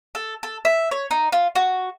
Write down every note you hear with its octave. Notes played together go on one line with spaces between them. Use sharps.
A4
A4
E5
C#5
D#4
F4
F#4